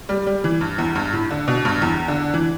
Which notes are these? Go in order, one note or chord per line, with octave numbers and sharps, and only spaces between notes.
G3
G3
E3
G2
E2
G2
A2
D3
B2
G2
E2
D3
E3